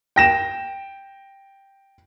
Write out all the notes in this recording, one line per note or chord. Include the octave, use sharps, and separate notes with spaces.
G5 A#6 E7